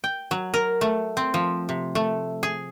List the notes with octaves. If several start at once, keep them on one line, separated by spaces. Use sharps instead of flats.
G5
F#3
A#4
A3
C4
F3
C3
A3
G#4